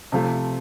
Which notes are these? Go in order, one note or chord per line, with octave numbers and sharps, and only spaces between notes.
C3 F3 A3